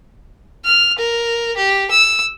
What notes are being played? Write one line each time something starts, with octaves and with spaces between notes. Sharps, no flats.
F6
A#4
G4
E6